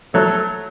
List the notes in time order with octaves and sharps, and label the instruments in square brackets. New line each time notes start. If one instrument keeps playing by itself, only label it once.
[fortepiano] F#3 A3 [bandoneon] A4